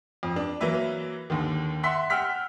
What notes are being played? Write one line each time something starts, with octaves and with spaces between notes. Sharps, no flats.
F2
D4
E3 F#3 A#3 B4 E5
D#2 D3 D#3
E5 F#5 C6 B6
F#5 G5 E6 F6 B6